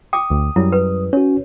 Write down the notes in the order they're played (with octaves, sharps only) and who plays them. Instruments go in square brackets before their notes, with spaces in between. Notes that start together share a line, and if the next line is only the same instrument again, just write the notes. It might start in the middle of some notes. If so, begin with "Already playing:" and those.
[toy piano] G5 D6 [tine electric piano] D#6
[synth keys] D2
[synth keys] F#2 G3 [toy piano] E4
[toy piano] B4
[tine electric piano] C#4 F#4 [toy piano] C#5